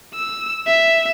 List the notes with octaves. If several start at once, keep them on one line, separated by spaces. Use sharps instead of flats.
E6
E5